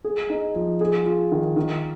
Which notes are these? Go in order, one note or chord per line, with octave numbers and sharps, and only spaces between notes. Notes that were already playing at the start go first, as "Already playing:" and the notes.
G#4
D#4
F3
G#4
F4
D#3
D#3